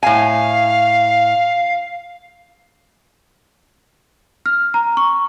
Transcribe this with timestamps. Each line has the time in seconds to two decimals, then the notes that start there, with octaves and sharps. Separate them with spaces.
0.03 A2 F5 G#5
4.46 F6
4.74 A#5
4.97 C#6